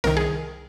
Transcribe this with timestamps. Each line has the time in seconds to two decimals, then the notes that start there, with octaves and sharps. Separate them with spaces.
0.04 C2 C3 D#3 A#4
0.17 G#4